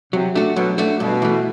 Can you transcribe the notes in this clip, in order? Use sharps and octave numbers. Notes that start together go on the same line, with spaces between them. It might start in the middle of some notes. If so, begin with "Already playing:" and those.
C3 F#3
A3 D4 F#4
B2 F#3
A3 D4 F#4
G2 B2
E3 A3